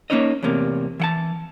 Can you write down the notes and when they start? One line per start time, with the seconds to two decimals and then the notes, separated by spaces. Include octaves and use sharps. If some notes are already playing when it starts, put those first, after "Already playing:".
0.10 A#3 C4 C#4 D#4 C#5 D#5
0.43 E2 A2 C3 A#3
1.00 E3 F#5 A5